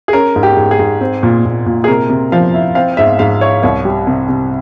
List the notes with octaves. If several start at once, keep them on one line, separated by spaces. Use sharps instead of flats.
G#4
C#4 A#4
G#2
G4
G#2
G#4
G#2
C4
A#2
A#2
A#2
G#4
C3 A#4
C3
F3 F5
E4
C4 F5
G#2 E5
G#2 F5
E4 C#5
C2 C#5
G3
C3
C3